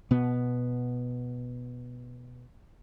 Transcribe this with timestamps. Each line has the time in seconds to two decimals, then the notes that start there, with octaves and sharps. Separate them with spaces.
0.11 B2 B3